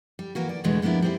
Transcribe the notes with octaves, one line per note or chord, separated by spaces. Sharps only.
G3
E3 A#3 F#4
D5
E2 B2 D3 E3 G#3 A3
F3 A#3 B3 D4 E4
G3 C4 E4